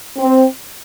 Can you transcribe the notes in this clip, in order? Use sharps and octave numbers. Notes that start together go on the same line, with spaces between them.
C4